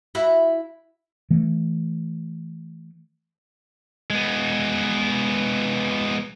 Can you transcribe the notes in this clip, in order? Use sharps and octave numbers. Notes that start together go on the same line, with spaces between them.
E4 F#4 E5
E3 A3
G#3 B3